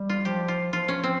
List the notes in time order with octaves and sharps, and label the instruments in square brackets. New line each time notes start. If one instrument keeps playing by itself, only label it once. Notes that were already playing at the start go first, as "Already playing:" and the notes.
Already playing: [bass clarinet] G3
[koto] F4
[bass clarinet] F3 [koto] G4
[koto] F4
[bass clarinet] F3 [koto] F4
[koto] C#4
C4